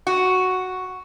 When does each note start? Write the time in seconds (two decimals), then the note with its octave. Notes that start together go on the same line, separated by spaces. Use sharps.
0.07 F#4